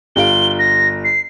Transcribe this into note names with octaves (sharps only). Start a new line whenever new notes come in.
G1 F4 D7 G7
A#6
C7